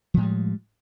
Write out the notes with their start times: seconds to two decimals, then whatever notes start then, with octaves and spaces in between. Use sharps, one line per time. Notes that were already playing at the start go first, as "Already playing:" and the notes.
0.14 F3
0.17 A2
0.20 G#3
0.23 G3